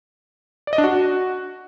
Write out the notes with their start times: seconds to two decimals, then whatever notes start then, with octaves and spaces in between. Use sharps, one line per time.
0.67 D5
0.73 D#5
0.78 D4
0.84 F#4